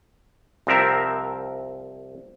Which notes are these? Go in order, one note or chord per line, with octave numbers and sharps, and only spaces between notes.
C2 F3 C4 A#4 E5